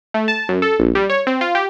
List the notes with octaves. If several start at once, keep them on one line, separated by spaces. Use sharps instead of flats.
A3
A5
F#2
A4
A#1
G3
C#5
C4
F4
G4